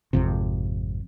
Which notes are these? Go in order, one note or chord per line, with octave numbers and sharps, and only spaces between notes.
G#1 F2 C3